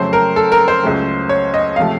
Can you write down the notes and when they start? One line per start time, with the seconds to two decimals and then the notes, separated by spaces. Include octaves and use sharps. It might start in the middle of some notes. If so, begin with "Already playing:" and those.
Already playing: F2 C#3 F#3 A3 C5
0.13 A#4
0.36 A4
0.52 A#4
0.68 C5
0.83 C#2 C#3 F#3 A3
1.29 C#5
1.54 D#5
1.76 C3 F3 A3 F5